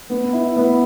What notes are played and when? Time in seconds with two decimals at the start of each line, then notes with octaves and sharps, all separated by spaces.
0.10 B3
0.33 E4
0.56 B3